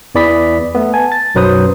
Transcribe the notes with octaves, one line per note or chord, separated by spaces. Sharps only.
E2 E3 D5 B5 D#6 B6
A3 B3
G#5 A5
A6
B1 F#2 F#3 B4 C5 D#6